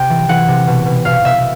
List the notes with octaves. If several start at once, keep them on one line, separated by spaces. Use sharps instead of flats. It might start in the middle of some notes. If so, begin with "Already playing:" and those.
Already playing: C3 G5
E3
E3 F#5
C3
B2
B2
B2 F5
B2 E5